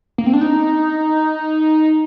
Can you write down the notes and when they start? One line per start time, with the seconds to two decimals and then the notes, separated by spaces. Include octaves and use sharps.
0.18 A#3
0.26 C4
0.33 D4
0.41 D#4